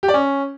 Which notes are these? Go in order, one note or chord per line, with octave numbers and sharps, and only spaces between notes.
G4
D5
C#4